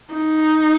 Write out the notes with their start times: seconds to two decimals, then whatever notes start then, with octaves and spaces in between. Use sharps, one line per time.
0.13 D#4